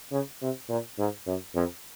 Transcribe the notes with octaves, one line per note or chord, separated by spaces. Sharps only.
C#3
C3
A#2
G#2
F#2
F2